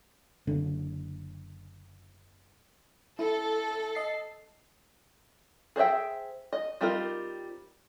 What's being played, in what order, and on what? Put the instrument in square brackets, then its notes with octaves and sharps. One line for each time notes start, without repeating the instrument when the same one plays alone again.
[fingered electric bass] F#1 D3
[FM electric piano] E4 [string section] A4
[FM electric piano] D#5 C7
[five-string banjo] G#4 C5 D#5 E5 G5
D#5
G3 C4 D#4 F4 A#4